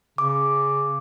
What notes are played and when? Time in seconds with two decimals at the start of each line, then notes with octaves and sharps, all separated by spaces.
0.18 C#3 D6